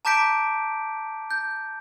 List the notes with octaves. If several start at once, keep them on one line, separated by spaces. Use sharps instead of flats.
A5 A#5 D6 G6 B6 D7
G6